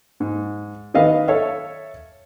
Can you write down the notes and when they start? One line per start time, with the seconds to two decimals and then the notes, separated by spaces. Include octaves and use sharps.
0.20 G#2
0.94 D#3 B3 D#5 F5
1.28 A4 C#5 E5 F5